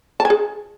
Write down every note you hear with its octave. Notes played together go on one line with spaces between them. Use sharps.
A5
G#5
G#4